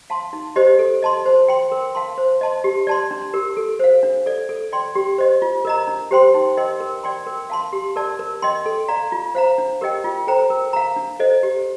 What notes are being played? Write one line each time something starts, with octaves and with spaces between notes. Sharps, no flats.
F5 A5 C6
D#4
G4 C5 D#5
A4
D#5 A5 C6
C5
G5 C6
A#4
F5 A5 C6
C5
D#5 A5 C6
G4
D5 A5 C6
D4
G4 A#4
A4
C5 F5
D4
A4 D5
A4
D5 G5 C6
G4
C5 D#5
F4
A#4 D#5 A#5
D4
G4 C5 G5 C6
D#4
A#4 D#5 G5 C6
A#4
D5 G5 C6
A#4
F5 A5 C6
G4
A#4 D5 A5
A#4
D#5 G5 C6
A4
D5 F5 A#5
F4
C5 F5 A#5
D4
G4 A#4 D#5 G5
F4
A4 C5 G5 A#5
A#4
F5 A#5
D4
A4 C5 D#5
G4